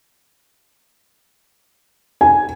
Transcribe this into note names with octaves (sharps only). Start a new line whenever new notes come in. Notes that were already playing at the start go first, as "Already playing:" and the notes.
G#5